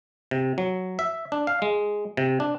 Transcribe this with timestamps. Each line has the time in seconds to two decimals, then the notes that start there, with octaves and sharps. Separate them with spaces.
0.31 C3
0.58 F#3
0.99 E5
1.32 D4
1.47 F5
1.62 G#3
2.17 C3
2.40 D4